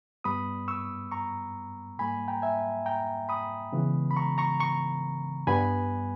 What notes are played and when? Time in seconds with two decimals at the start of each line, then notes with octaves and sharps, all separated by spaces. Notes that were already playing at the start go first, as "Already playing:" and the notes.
0.24 G2 G3 B3 B5 D#6
0.68 C#6 E6
1.11 A#5 C#6
1.98 G#2 G3 A#3 G#5 B5
2.28 G5 A#5
2.42 E5 G#5
2.86 G5 A#5
3.29 B5 D#6
3.73 C#3 E3 G#3 B3
4.11 B5
4.17 A#5 C#6
4.38 A#5 C#6
4.60 A#5 C#6
5.47 G2 G3 B3 G#5 B5